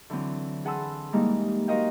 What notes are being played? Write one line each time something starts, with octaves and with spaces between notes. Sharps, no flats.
D3 E3 F#3 C4
G#4 F#5 A5 B5 C6 E6
G#2 E3 G3 G#3 A#3 D#4
F#4 A#4 C5 D#5 F5 G5